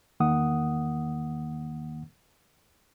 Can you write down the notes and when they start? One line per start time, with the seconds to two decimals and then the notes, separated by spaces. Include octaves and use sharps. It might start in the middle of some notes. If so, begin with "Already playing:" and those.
0.20 E2 D#3 A#3 F#5 D#6